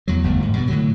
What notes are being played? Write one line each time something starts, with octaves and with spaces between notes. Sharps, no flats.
E2 F#3
G1 E2 C#3 A3
G#2
G2 B2
A2 D3 F#3